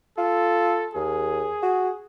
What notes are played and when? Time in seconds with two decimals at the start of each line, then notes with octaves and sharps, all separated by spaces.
0.18 F4 A4
0.95 D#2 G#4
1.63 F#4